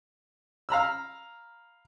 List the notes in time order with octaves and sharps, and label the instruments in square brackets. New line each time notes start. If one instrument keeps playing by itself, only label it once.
[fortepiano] F5 A#5 B5 E6